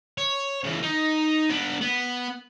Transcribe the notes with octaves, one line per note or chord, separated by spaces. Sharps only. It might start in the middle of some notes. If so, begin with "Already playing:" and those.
C#5
C#3 E3
D#4
B3 D4
B3